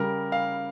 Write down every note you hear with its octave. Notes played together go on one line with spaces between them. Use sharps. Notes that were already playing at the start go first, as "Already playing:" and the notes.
Already playing: C#3 G3 A#4
F5